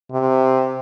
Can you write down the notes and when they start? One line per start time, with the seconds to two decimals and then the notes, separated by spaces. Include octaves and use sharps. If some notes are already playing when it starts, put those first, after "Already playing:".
0.12 C3